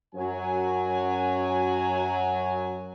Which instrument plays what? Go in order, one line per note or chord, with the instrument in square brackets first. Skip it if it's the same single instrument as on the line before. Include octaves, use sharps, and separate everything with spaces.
[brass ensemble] F#2 F#3 G#5